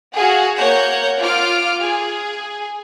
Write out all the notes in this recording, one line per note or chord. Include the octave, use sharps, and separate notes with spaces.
F#4 G#4 F5 F#5
A#3 C#5 F#5 G6
F4 D6 F6
G#4